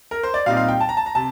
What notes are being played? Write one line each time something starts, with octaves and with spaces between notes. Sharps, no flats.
A#4
C5
D5
A#2 G3 C4 D#4 F5
F5
G5
A5
A#5
A5
A#5
C3 A5